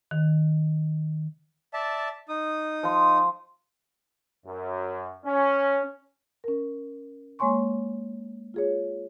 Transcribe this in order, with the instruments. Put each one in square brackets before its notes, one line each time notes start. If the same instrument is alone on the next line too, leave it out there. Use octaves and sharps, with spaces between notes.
[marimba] D#3
[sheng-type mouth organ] D5 E5 A5
D#4 D#6
[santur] F3 C6
[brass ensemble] F#2
C#4
[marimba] C#4 A#4
G#3 A#3 C#5 G#5 C6 C#6
F4 G#4 C#5